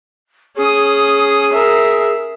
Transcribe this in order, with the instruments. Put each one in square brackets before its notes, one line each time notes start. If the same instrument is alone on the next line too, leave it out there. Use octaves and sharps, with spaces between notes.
[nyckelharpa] C#4 D#6 [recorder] G#4
[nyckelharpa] A#4 E5